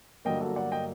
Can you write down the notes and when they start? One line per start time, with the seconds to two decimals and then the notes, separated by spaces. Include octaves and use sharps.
0.25 G1 G2 F#3 A#3 D#5 G5
0.41 F#4 A4
0.56 D5 F#5
0.71 D#5 G5